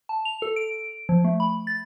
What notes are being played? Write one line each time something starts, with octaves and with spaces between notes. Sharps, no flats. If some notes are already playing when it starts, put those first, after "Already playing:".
A5
F7
A4
D7
F3
A3
B5
A6